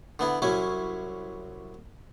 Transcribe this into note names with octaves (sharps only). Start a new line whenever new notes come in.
D3 B3 E4
C2 F#3 C#4 E4 G#5